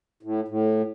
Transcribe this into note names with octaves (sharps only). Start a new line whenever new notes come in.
A2
A2